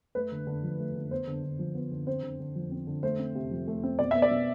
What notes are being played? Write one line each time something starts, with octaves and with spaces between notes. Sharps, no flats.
A3 B4
D3
D3
F3
A3
D3
B3 C5
D3
D3
F3
B3
D3
C4 C5
D3
D3
F3
C4
D3
A3 C5
C4
C3
F3
A3
C4
B2 D5
B3 E5
D5
B2